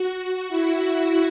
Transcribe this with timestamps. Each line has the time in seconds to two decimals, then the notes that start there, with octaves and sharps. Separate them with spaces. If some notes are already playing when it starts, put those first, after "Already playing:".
Already playing: F#4
0.49 E4